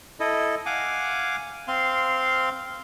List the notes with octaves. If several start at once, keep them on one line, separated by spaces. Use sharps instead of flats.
E4 A4 D#5
F5 F#5 G#5 D6
C4 F5 C6